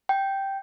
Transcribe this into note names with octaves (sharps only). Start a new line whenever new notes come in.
G5